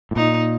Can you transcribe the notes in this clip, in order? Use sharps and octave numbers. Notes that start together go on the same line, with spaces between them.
A2
A#2 D#4